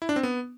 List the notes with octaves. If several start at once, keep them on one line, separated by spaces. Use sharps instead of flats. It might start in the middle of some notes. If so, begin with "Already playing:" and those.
E4
D4
C4
B3